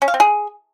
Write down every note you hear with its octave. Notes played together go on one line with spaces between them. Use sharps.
C#4
F5
C4
G#4